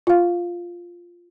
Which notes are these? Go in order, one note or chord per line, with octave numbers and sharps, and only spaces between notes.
F4 F5